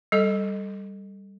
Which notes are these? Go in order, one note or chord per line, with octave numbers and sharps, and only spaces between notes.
G3 A4 D#5